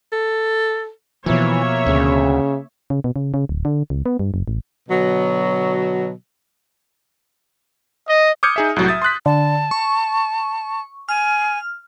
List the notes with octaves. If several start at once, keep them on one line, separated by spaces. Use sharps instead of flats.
A4
B2 E3 F3 A#3 C#5 E5
D2 C#3
C#3
B2
C#3
C#3
D1
D3
C#2
B3
G2
F#1
A1
B2 D3 F#3
D#5
D6 D#6 F6 G6 G#6 C#7
D#4 G#4 E5
C2 A2 F#3 F#4
E5 D#6 A6
C6 D#6 F#6 B6
D3 A5
C#6
G#5 F6